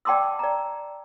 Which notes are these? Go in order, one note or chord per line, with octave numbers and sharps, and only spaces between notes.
D5 G5 A5 C6 D6 E6
D5 A#5